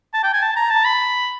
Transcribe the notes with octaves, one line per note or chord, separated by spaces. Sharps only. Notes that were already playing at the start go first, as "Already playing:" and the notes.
A5
G5
G#5
A5
A#5
A5
B5